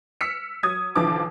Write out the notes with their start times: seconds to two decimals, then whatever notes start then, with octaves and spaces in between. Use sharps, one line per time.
0.21 E6 F6 B6 C#7
0.63 F#3 D#6 G#6
0.95 B1 D3 E3 F3 D6